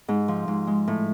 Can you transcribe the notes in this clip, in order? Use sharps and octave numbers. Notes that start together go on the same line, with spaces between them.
G#2
F3
G#2
G#3
A2